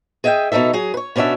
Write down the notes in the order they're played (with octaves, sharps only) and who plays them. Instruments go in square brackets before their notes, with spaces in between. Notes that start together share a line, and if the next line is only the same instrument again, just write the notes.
[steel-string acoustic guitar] G#4 D#5 E5 F#5 G5
B2 D#3 D#4 A4 E5
F#3 G#4
B4 C#5
B2 C#4 D4 F#4 E5